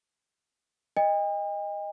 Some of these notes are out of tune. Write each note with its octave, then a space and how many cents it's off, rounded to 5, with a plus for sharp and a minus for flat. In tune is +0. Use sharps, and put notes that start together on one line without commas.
D#5 +0 G5 +45